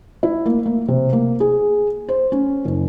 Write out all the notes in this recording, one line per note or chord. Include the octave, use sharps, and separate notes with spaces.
E4
A#3
A#3
C3
A#3
G#4
C5
C#4
F#1